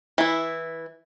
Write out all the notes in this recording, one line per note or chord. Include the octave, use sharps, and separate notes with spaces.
E3 E4